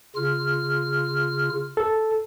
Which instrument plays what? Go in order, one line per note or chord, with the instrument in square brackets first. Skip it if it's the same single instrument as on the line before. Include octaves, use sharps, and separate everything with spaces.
[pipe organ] C#3 F4 F6
[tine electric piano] A4